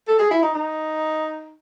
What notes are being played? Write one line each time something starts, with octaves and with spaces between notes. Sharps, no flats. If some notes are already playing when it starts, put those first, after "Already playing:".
A4
G#4
E4
D#4
D#4